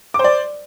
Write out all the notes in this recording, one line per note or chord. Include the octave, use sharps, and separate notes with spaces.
C5 D5 D6